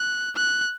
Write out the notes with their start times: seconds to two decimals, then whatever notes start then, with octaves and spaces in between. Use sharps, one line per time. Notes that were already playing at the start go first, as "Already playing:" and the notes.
Already playing: F#6
0.36 F#6